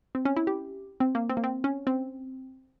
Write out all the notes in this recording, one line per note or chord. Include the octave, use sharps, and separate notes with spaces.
C4
C#4
E4
G4
C4
A#3
C4
A#3
C4
C#4
C4